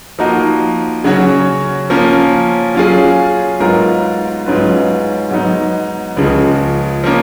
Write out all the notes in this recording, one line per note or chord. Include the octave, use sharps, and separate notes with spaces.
F3 A#3 D#4 F#4
C#3 F#3 C#4 F#4 C#5
F3 A#3 C#4
F#3 C#4 F4 G#4
G#2 F#3 B3 F4 A#4
G#2 F#3 C#4 F4 B4
G#2 F#3 B3 D#4
C#2 C#3 F3
F3 A#3 C#4